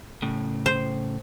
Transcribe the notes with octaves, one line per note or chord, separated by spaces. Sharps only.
A2 C#3
C5